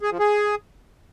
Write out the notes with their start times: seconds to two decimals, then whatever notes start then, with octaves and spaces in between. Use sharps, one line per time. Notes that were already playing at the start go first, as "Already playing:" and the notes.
0.01 G#4
0.10 F3
0.20 G#4